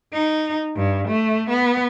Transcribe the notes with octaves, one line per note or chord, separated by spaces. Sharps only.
D#4
G2
A3
B3